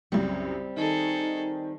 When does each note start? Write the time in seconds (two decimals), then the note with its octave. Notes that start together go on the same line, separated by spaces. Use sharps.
0.12 C2 F#2 C#3 G3 C4
0.77 D#3 D#4 G#4 A4